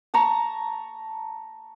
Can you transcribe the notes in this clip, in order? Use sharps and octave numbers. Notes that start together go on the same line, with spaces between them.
A5 A#5 C#6